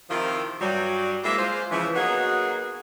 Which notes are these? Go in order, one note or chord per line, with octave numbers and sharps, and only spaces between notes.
C3 D#3 F3 E4 F4
G2 F#3 G3
G3 G#3 A#3 C4 E4 E5
G#3 F4 C5
C#3 E3 F3
F#3 A#3 B3 D#4 F#4 G#4